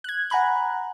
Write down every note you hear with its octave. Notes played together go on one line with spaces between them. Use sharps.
F#6 G#6
F#5 G#5 A#5 B5 F#6